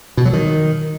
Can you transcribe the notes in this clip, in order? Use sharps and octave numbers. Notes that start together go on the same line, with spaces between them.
B2
F#3
D#3